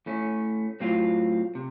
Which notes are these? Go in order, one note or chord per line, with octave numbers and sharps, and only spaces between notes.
A2 A3 C#4
A2 F#3 C4 F4
C3